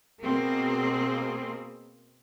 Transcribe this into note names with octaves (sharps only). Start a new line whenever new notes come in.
B2 A#3 C4 G#4